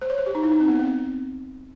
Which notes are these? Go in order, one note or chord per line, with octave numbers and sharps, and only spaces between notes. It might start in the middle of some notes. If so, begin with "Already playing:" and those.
C5
C#5
C5
G4
D#4
E4
D#4
C4
B3
C4